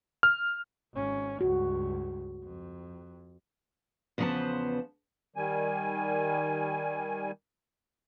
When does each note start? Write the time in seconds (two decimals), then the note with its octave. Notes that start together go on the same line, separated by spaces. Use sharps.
0.23 F6
0.93 G#1 C#4
1.41 C#2 G2 F#4
2.44 F2
4.18 E2 C#3 F3 B3 C5 A5
5.36 D#3 G3 G#5